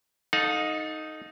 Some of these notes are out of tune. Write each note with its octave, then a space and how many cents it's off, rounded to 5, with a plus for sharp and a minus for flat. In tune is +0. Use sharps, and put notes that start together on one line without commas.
D#4 +0 A4 +0 F5 +45